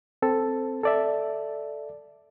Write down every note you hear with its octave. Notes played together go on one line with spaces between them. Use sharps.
C4 A4
A4 D5 E5